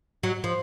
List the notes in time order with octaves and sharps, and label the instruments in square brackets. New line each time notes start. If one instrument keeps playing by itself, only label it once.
[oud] F#3
F3